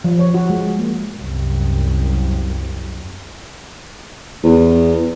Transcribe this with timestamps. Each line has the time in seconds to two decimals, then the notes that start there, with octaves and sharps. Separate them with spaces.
0.04 F3
0.19 C#5
0.34 F#4
0.50 G#3
0.79 A#3
1.16 C2 F#2
4.43 E2